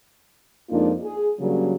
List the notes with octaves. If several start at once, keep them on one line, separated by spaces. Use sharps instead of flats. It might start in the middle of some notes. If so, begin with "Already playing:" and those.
F2 G#3 A#3 D4 D#4 F4
G#4
C#3 F#3 G3 A#3 D4